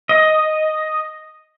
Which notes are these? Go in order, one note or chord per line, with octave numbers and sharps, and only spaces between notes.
D#5